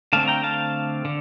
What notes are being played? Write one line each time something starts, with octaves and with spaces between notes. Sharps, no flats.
D3 A3 C4 F5 A5
G5 A#5
F5 A5
D3